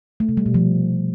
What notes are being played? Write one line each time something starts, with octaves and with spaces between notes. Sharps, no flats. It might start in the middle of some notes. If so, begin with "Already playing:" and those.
A3
C3
G3
B2
F3